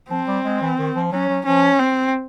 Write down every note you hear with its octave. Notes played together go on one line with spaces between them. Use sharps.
F3 C4
G3
G#3
E3
D#3
F3
F#3 C#4
F#3
F3 C#4
C4